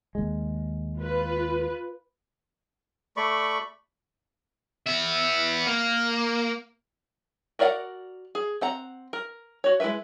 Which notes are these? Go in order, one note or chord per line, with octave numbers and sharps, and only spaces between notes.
D#2 G#3
F4 B4
A3 D5 B5 C#6
B3 E5
A#3
F#4 A#4 D5 F5 F#5
G#4
C4 F#5 A#5
A#4
F#4 C#5
G#3 E4 A#4 B4 E5